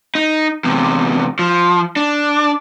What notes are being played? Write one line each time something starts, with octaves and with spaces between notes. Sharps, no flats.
D#4
E2 C3
F3
D4